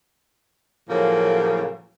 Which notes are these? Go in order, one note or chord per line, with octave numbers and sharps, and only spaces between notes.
A2 C#3 F3 F#3 A#3